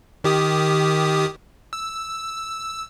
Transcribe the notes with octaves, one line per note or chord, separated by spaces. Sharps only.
D#3 G4 D#6
E6